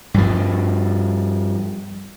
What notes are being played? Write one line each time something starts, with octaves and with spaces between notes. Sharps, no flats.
G2 F3